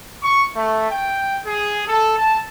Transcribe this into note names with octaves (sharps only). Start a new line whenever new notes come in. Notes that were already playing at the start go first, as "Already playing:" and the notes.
C#6
A3
G5
G#4
A4
A5